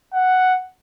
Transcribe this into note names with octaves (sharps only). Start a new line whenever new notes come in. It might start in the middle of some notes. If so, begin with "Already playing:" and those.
F#5